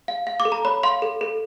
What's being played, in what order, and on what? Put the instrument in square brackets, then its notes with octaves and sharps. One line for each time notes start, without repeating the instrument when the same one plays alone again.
[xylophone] F5
F5
D6
A4
A#5
C#5 B5
F5 C6
A4
A4